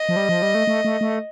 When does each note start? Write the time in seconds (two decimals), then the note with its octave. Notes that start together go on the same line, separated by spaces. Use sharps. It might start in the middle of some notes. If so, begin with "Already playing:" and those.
Already playing: D#5
0.09 F3
0.16 G3
0.29 F3
0.42 G3
0.55 A3
0.67 A3
0.85 A3
1.01 A3